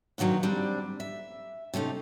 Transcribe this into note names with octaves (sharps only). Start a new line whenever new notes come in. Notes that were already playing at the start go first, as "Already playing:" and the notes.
G2 A#2 D#3 F#3 D#4
G3 C4 D4
E5
C3 A3 C#4 D#4